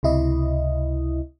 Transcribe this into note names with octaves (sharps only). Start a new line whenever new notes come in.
C#2 C3 E4 D#5